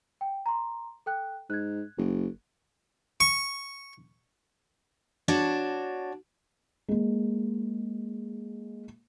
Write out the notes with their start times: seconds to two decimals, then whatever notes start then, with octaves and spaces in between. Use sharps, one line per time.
0.21 G5
0.46 A#5 C6
1.06 A4 G5 F#6
1.50 G#2 F#6 G#6
1.98 F#1
3.20 C#6
5.28 D4 F#4 C#5 A5
6.88 G#3 A#3